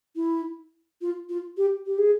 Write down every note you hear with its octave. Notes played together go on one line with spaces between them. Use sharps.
E4
F4
F4
G4
G4
G#4